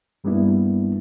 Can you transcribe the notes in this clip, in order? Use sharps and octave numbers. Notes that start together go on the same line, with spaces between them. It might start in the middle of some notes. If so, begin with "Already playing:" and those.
G2 G3 A#3 B3 D4 E4